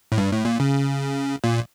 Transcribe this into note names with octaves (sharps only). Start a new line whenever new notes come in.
A2
G2
A2
A#2
C#3
A#2